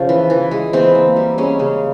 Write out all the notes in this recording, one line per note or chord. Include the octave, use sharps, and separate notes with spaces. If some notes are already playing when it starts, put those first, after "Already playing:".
Already playing: C#3 F3 C#4
E3
E3
G#3
E3 C4
A#3
G3
G#3 C#4
C#3